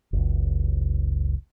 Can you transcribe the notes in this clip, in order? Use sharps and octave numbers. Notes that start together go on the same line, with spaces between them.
F#1 C#2